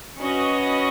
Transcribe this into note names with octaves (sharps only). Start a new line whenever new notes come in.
C#4 F#4 B4 D#5